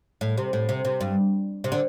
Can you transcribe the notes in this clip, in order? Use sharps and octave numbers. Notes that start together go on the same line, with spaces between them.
A2
C3
A2
C3
C3
G2
C3
D3